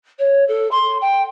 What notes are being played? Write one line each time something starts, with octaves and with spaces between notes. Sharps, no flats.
C#5
A4
C6
G5